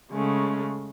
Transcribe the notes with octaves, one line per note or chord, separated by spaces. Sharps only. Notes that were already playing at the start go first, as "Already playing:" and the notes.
C#3 G#3 A3 C#4